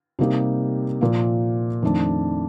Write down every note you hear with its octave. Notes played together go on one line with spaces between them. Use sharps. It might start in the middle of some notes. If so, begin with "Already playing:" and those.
C3 G3 A#3 D#4 G4
A#2 F3 A#3
F2 D#3 A3 D4